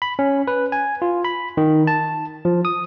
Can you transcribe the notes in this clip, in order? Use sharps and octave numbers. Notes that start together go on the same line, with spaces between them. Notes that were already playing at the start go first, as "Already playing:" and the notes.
B5
C#4
B4
G#5
F4
B5
D#3
A5
F3
D#6